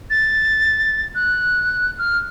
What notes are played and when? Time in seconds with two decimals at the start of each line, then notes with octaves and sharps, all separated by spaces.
0.10 A6
1.15 F#6
1.99 F6